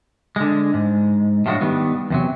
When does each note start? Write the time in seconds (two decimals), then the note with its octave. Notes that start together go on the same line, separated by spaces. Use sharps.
0.36 D3 G#3
0.74 G#2
1.46 A2 F3 F#3 G#3 D4 F#4
1.61 D#3 G3 B3
2.10 E2 C3 F#3